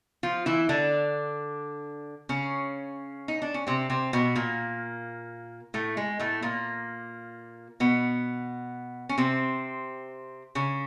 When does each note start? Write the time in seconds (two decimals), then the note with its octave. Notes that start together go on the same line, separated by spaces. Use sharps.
0.23 F3 F4
0.46 E3 E4
0.69 D3 D4
2.29 C#3 C#4
3.28 D#4
3.42 D4
3.54 C#4
3.67 C3 C4
3.90 C3 C4
4.13 B2 B3
4.36 A#2 A#3
5.74 A2 A3
5.97 G#3
6.20 A2 A3
6.42 A#2 A#3
7.80 B2 B3
9.09 C#4
9.18 C3 C4
10.55 C#3 C#4